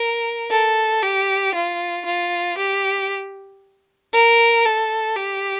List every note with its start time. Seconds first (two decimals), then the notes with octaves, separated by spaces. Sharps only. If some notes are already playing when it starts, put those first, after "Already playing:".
Already playing: A#4
0.51 A4
1.02 G4
1.54 F4
2.05 F4
2.57 G4
4.13 A#4
4.65 A4
5.16 G4